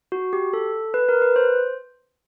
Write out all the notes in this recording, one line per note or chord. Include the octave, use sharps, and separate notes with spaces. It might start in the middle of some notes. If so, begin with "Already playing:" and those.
F#4
G4
A4
B4
A#4
B4
C5